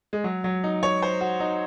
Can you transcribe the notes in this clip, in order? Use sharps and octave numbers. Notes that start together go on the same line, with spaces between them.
G#3
F#3
F#3
D#4
C#5
C5
F#4
D#4